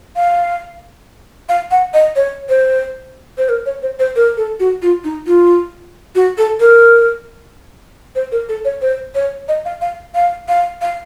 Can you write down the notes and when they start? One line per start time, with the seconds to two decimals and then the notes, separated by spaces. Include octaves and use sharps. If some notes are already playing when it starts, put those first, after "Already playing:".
0.16 F5
1.49 F5
1.71 F#5
1.94 D#5
2.16 C#5
2.49 C5
3.38 C5
3.49 A#4
3.66 C#5
3.82 C5
3.99 C5
4.16 A#4
4.37 A4
4.60 F#4
4.82 F4
5.04 D#4
5.27 F4
6.15 F#4
6.38 A4
6.60 A#4
8.15 C5
8.32 A#4
8.49 A4
8.65 C#5
8.82 C5
9.15 C#5
9.48 D#5
9.65 F5
9.81 F5
10.15 F5
10.48 F5
10.82 F5